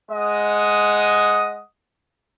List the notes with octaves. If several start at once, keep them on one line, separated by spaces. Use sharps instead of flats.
G#3 D#5 F#5 D#6